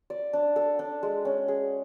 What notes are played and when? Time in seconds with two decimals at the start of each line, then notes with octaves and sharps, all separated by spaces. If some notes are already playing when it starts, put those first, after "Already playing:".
0.10 D5
0.33 D4
0.56 A4
0.79 D4
1.03 G#3
1.25 C#4
1.48 G#4